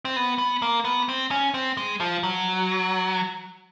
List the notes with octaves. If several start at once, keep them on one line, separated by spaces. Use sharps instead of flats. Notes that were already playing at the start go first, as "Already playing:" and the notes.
C4
B3
B3
A#3
B3
C4
C#4
C4
G#3
F3
F#3